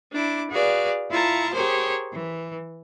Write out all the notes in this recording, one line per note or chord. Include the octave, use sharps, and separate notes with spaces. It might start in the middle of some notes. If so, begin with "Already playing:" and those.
D4 E4 D6
F#4 G#4 B4 D5 F5
E4 F4 A5 A#5 C#6
G4 G#4 A#4 C5 C#5
E3